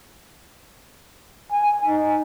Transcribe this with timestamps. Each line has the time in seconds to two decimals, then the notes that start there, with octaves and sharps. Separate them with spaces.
1.52 G#5
1.85 D#4